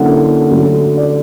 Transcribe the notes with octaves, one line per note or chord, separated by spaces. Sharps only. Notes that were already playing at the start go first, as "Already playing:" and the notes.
Already playing: D3 F#3 A#3 C#4 E4 F#5
D3 F#3 A3
D5